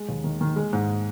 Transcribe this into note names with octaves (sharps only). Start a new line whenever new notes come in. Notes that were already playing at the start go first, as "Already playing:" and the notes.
Already playing: G#3
D#2
D#3
D#3
G#3
G#2